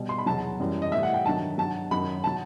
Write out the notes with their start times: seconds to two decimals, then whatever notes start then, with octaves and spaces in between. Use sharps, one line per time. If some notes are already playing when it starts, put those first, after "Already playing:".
Already playing: B2 G3
0.09 C6
0.18 B5
0.26 E2 B2 F#3 A5
0.60 F#2 E3 G3
0.82 D#5
0.92 A2 E3 G3 E5
1.03 F#5
1.14 G5
1.25 G2 D#3 F#3 A5
1.58 G2 F#3 A5
1.91 F#2 D#3 F#3 B5
2.24 F#3 A5